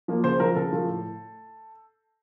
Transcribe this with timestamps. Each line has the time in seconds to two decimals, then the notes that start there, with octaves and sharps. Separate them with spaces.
0.08 F3 A#3
0.24 C#3 C5
0.40 F3 A3 A#4
0.55 C#3 A4
0.72 F3 A3
0.87 A2